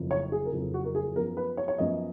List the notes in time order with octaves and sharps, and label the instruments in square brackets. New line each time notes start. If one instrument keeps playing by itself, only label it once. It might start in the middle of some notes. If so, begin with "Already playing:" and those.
Already playing: [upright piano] F#1 F2 F3
C#5
G#4
A#4
F#1 F2 F3 G#4
F#4
A#4
G#4
F#2 F3 B3 A#4
B4
C#5
C#5
F#2 F3 B3 D#5